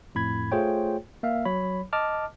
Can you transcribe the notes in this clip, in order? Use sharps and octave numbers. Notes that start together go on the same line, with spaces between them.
F2 A2 B5 G#6
A3 F4 G#4 C5 C#5 G5
A#3 E5 F5
F#3 C#5 B5
D#5 A5 D6 F6